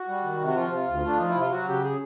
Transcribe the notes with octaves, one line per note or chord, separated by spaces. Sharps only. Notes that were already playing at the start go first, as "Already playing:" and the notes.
Already playing: F#4
G3
D#3
C3
F#4
F3 F4
C3
D2
A3 D4
F3 D#4
E4
C3 F4
F#3 F#4
C#3 G4
G#4